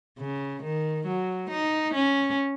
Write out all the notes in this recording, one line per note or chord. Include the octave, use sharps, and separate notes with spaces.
C#3
D#3
F#3
D#4
C#4